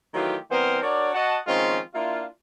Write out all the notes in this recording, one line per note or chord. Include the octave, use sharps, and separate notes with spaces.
D#3 E3 F#3 A3 F4 G4
E3 G3 B3 C4 A#4 C5
D4 F#4 A#4 C#5 D5
F#4 D#5 F#5 A5
D#3 F3 G#3 C4 C#4 F4
A#3 D4 E4 F4